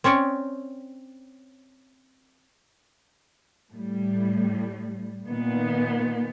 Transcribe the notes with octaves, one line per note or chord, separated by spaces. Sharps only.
C4 C#4 C#5 D5
A2 G3
A#2 D#3 B3